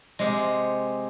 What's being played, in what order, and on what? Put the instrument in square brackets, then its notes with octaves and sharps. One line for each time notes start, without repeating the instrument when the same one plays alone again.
[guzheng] C3 G#3